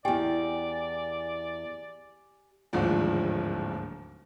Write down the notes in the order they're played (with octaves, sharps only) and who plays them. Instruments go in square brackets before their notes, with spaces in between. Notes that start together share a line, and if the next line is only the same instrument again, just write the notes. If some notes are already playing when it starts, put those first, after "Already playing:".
[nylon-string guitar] E2 G5 [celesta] G4 G#5 [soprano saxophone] D5
[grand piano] D1 D#2 G#2 F3 D4